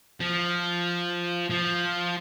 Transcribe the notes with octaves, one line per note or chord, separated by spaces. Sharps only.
F3
F3